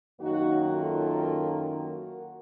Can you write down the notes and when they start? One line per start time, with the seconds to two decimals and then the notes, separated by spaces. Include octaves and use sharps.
0.20 F#2 D#3 A#3 D#4 F#4
0.73 F4 A4
1.78 F#4 A#4